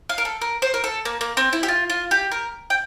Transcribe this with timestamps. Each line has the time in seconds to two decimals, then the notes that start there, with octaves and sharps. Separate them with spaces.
0.09 F5
0.18 A#4
0.25 A4
0.41 A#4
0.62 C5
0.74 A#4
0.84 A4
1.05 A#3
1.21 A#3
1.37 C4
1.53 E4
1.63 G4
1.68 F4
1.90 F4
2.11 G4
2.32 A#4
2.70 G5